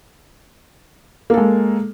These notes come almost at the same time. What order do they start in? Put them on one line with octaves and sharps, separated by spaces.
A#3 A4 G#3